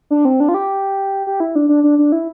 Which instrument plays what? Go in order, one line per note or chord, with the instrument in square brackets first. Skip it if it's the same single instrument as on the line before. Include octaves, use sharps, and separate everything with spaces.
[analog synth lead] D4
C4
D4
F4
G4
G4
E4
D4
D4
D4
D4
E4